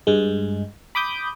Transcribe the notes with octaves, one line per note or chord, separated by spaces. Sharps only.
G2 G#3
B5 D6 D#6 G6